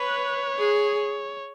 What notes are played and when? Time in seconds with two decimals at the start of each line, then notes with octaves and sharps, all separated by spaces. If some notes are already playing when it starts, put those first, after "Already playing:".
Already playing: B4 C#5
0.59 G#4